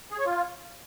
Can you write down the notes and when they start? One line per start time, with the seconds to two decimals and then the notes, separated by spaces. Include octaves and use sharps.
0.12 G#4
0.19 C#5
0.26 F4